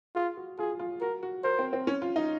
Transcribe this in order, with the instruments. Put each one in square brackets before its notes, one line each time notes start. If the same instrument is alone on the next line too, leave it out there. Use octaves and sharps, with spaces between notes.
[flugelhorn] F4 [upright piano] G#4
[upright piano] F#4
[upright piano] F4 [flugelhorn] G#4
[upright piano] F4
[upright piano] F#4 [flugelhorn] A#4
[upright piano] F#4
[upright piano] A#4 [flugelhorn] C5
[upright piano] C4
C4
C#4
F4
D#4